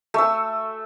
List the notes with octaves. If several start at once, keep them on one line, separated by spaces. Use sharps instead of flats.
A3 E6